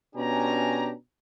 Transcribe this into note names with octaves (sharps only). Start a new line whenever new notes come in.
B2 C#4 D4 G4 G#5 A#5